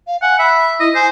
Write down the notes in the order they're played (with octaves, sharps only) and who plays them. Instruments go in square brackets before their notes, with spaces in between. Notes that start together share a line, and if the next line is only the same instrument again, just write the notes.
[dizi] F5
[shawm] F#5 [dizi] G#5
[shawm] E5 [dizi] B5
[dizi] E4 [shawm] D#5
[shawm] C5 [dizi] G#5